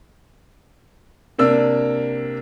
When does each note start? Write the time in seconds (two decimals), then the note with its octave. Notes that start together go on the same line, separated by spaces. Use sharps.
1.39 C3 A#3 D4 E6